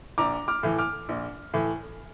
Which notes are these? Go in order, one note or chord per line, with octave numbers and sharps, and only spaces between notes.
A#1 A#5 D6
D6 F6
A2 E3
D6 F6
A#1
A2 E3